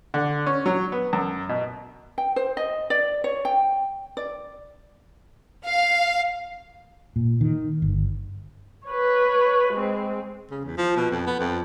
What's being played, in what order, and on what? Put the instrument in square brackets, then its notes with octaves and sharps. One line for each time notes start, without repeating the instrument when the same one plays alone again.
[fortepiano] D3
C#4
F#3
B3
F#2
B2
[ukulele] G5
C5
D#5
D5
C#5
G5
D5
[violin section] F5
[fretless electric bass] A#2
D#3
G1
[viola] B4 C#5
G#3 C4
[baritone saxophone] C#3
E2
F3
B2
F2
B3
F2